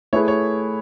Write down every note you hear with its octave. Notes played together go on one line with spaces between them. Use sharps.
A3 E4 G#4 B4 C#5
C#5